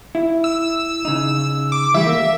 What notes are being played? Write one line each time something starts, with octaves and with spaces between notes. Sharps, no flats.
E4
E6
C#3 D#4
D6
E3 G3 A3 E5
A#3